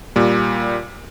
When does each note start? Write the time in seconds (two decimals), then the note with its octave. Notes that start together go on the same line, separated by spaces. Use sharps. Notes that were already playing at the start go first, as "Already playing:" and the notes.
0.16 A#2 G3